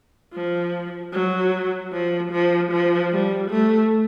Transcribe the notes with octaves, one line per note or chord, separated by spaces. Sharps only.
F3
F#3
F3
F3
F3
G3
A3